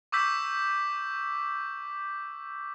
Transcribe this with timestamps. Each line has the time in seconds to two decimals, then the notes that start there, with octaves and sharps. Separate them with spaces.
0.12 C#6 D6 E6 G6 B6